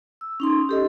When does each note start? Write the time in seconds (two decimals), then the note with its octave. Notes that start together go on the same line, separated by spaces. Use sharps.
0.21 E6
0.40 C#4 D#4 C6
0.69 G4 A4 D#5